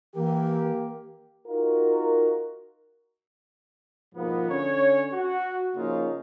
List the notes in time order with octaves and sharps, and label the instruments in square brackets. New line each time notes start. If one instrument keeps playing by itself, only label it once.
[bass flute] E3 [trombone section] A#3 G4 A#4
[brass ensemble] D#4 F4 F#4 A#4
G#2 B2 F3 A#3 B3
D3 C#4 C#5
F#4
C#3 F3 A#3 C#4 D#4 F4